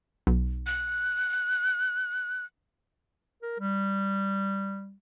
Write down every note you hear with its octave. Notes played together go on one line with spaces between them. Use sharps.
B1
F#6
A#4
G3